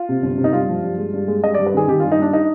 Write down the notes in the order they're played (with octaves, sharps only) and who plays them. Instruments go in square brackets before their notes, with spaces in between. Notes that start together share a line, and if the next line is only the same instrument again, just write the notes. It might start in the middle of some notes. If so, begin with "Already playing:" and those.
Already playing: [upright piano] F4
C3
G1
C3
D#4
G2 F4
F3
G2
G#3
G2
G#3
G2 D#5
G2 D5
B4
D#3 G#4
D#3 G4
G2 F4
D#4
G3 D4
D#4